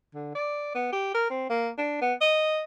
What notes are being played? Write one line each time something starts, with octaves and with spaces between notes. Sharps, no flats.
D3
D5
B3
G4
A#4
C4
A#3
D4
B3
D#5